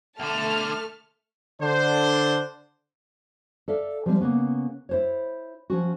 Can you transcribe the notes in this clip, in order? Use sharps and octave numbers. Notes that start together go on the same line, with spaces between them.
B1 D3 A3 A5 F6
D3 D4 C5
A4 D5 E5 F5
F3 G3 G#3 A#3 C4 E4
C#3 A#3 B3 C#4
E4 C5 C#5
F3 C#4 F#4